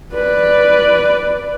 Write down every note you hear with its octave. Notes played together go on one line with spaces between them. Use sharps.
B4 D5